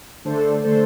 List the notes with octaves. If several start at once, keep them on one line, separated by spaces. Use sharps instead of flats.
D3 A3 D4 A4 C5
D3 A3 D4 A4 C5